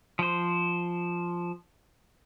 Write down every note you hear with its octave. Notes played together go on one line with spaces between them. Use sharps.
F3 C5